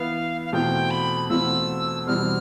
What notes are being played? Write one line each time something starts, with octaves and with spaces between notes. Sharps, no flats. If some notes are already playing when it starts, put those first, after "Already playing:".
Already playing: E3 B3 E4 B4 F5
F5
E2 B2 A3 C4 F4 G5
B5
E2 B2 A3 C4 F4 E6
E2 B2 G3 C4 F6